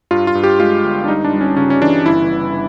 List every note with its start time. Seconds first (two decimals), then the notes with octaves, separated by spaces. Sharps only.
0.11 G2 F4
0.27 F4
0.35 G2
0.43 G4
0.60 G#3 F4
0.84 G1
1.04 D4
1.08 G3 D#4
1.25 D4
1.33 G3
1.41 C#4
1.57 C#3 C#4
1.70 C#4
1.81 E3 D4
2.05 G1 E4
2.30 G1